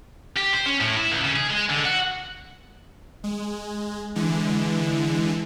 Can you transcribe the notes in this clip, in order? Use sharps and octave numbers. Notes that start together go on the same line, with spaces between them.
G4
C5
C#4
A2
E4
C#2
C#3
G#4
G#3
D3
F#4
G#3
D3 E3 G#3